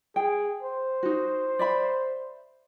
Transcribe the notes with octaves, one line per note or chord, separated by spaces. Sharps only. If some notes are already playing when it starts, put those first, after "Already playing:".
G#4 G5
C5
D#4 F#4
D5 E5 B5